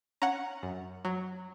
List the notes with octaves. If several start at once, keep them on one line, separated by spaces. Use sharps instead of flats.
C#4 F#5 A#5
F#2
F#3